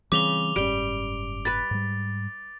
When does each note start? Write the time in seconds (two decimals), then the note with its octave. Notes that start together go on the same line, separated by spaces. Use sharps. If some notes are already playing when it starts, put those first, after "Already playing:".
0.12 C#3 E3 G3 C4 D6 F7 G7
0.56 F#1 G#2 G3 C#4 D7 G7
1.45 B4 B5 A6
1.71 G#2 G3